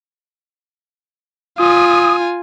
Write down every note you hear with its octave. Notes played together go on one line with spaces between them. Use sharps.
F4 G#5 D#6